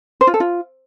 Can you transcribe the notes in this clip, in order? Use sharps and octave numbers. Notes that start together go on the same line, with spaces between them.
C5
F4
A4
F4